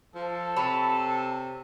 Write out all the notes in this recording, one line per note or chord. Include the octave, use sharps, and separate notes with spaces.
F3 A4
C3 C#5 A5 B5